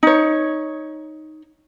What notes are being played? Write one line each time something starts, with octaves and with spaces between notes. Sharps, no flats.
D#4 C#5